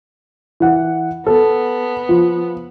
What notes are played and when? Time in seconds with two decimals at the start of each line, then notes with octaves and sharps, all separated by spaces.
0.60 E3 F#5
1.26 B3 A4
2.09 F3